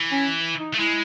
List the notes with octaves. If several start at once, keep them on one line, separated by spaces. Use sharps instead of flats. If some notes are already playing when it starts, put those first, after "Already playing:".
Already playing: E3
C#4
D#4
A3
G#3 E4